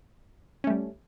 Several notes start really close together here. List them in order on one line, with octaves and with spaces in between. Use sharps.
C#4 A3 G3